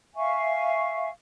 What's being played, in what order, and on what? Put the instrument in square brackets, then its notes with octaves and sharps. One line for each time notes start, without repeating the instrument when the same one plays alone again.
[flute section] E5 F5 G#5 C#6